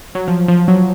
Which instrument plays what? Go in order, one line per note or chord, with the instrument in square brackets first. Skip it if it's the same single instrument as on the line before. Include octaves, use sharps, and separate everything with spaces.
[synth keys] F#3
F3
F3
F#3